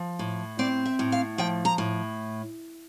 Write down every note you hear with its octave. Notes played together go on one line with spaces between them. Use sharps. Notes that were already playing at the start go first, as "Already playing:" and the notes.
Already playing: F3
A2
C4 D5
E5
A2
F5
F3 G5
A#5
A2